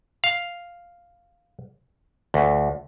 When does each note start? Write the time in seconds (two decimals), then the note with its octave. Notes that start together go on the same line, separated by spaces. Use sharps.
0.24 F5
2.34 D2